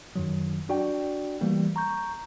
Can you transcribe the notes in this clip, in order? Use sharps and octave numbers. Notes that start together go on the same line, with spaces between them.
F#2 D#3 F#3
D4 F#4 D5 G5
E3 G3 A3 A#3
A#5 C#6 G6